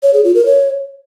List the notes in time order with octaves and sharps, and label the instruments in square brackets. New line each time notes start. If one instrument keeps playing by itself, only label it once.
[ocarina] C#5
G#4
F4
A#4
C#5